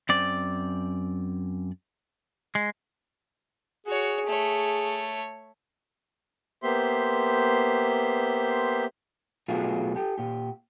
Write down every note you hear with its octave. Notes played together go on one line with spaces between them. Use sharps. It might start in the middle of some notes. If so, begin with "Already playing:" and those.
F#2 C4 D5
G#3
F#4 G#4 C#5
A3 C#5
A#3 B3 G4 C5 E5 C6
B2 F#3 A3 B3 F4 G#4
G4 A4
A#2 G4